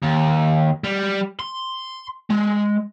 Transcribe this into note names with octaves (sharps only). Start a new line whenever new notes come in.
D#2
G3
C6
G#3